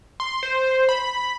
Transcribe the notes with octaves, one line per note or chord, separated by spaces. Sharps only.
C6
C5
B5